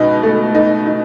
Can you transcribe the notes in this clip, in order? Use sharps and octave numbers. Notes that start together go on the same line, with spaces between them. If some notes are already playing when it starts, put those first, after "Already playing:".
Already playing: C#2 B2 D#4
A3
D#4
D#4